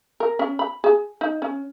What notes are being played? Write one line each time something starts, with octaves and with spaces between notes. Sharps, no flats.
A#4
C#4
B5
G#4
D#4
C#4